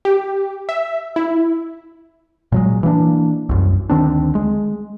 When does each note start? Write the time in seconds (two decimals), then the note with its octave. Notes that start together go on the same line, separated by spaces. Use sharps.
0.05 G4
0.69 E5
1.16 E4
2.52 A#2 F#3 G#3
2.83 E3 A#3 B3 D4
3.49 C2 F#2
3.90 D2 D#3 C4 D4
4.35 G#3